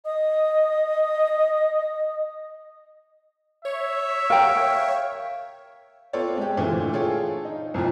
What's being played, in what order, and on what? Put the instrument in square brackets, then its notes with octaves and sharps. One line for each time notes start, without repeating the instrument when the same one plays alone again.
[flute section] D#5 D#6
[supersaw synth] C#5 [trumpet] E5
[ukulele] A#4 G5 [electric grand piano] F5
[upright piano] B3 C4 F4 A4 C#5 D5
G#3 G4
A#2 D3 E3 A3
F4 G#4 A4 C#5 G5
D#4
C2 F2 A#2 F3